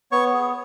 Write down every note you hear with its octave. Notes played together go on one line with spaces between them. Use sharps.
B3 C#5 C#6
G#4